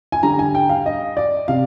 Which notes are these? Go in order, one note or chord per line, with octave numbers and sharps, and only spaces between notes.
G#5
D3 G3 A#5
G#5
G5
F5
D#5
D5
C3 F5